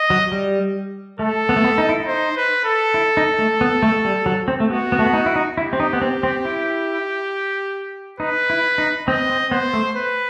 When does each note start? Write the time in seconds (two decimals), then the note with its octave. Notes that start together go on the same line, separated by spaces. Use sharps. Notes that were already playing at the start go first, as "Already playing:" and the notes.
Already playing: D#5
0.10 F#3
0.32 G3
1.19 A3 A4
1.49 B3
1.56 A3
1.64 B3
1.78 D#4
1.89 E4
2.00 D#4
2.07 C5
2.37 B4
2.65 A4
2.94 E4
3.17 D#4
3.39 A3
3.61 B3
3.83 A3
4.05 G3
4.26 F#3
4.48 C4
4.60 A3
4.70 B3 F#4
4.92 B3
4.99 A3
5.06 B3
5.14 D#4
5.26 E4
5.36 D#4
5.58 E4 G4
5.73 C4
5.80 D#4
5.93 B3
6.02 C4
6.23 C4
6.45 E4
8.20 D#4 B4
8.50 E4
8.78 D#4
9.08 C4 D#5
9.30 C4
9.51 B3 C5
9.73 A3
9.96 B4